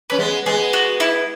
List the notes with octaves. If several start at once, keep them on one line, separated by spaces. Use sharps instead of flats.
C#4 B4
G#3 B3
G#3 B3 G#4
F#4
E4